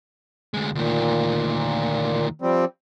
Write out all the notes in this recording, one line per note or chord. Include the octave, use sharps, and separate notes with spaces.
D2 G#3
D2 A#2 D#3
F3 G3 C4